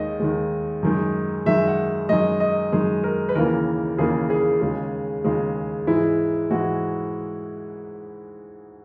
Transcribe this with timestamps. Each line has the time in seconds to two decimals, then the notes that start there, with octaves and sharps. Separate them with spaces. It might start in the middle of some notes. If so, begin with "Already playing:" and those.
Already playing: D#2 D#3 G#3 D#5
0.20 D#2 D#3 G#3
0.83 F#2 D#3 G#3
1.46 F#2 D#3 G#3 E5
1.67 F#5
2.09 F#2 D#3 G#3 D#5
2.40 D#5
2.72 F#2 D#3 G#3
3.04 A#4
3.29 B4
3.35 D#2 C#3 E3 A#3 A#4
3.98 D#2 C#3 E3 A#3 G#4
4.30 G#4
4.61 D#2 C#3 G#3
5.24 D#2 C#3 G#3
5.87 G#2 E3 G#3 E4
6.50 G#2 E3 G#3 F#4